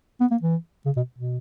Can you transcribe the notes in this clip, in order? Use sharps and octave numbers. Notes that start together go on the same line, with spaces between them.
B3
A#3
E3
C#3
B2
B2